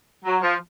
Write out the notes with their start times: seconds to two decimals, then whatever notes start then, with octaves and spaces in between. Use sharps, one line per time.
0.25 F#3
0.42 F3